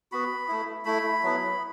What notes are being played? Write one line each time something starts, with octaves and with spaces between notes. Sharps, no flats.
B3 F#4 B5
A3 E4
A3 E4 B5
F#3 B3 E4